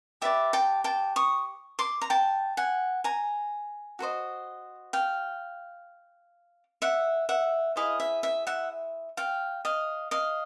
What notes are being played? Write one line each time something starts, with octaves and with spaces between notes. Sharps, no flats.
G4 B4 D5 E5
G5 A5
G5 A5
C#6 D#6
C6 D6
A#5
G5 A5
F#5 G#5
G#5 A#5
F#4 A4 C5 D#5
F5 G5
E5 F#5
E5 F#5
E4 G#4 C5 D#5 F5
E5
E5
E5 F#5
F5 G5
D#5 F5
D#5 F5